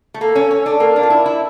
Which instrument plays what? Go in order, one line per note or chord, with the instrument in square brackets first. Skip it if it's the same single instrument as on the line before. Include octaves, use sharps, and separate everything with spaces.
[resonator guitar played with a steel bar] A3
[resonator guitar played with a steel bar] A#3 [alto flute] A4
[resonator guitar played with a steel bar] C#4
C#4
D4
[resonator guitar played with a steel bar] A#3 [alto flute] A#4
[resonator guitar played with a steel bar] D4
F4
E4
E4